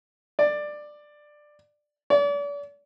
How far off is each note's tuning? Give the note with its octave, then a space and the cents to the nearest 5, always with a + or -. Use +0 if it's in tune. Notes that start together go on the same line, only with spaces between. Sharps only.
D5 +15
D5 -40